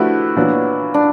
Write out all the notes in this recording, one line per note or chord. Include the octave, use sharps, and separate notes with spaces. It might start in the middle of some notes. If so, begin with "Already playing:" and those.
Already playing: F3 A3 D4 E4 F#4 G4 B4
A#2 F#3 B3 D4
D4